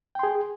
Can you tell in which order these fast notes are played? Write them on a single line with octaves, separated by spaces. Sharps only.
G5 C6 G#4